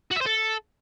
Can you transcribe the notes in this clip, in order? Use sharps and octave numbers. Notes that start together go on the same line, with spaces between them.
F#4
E5
C5
A4